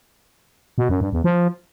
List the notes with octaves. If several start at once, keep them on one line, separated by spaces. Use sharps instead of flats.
B2
F#2
G2
E2
F3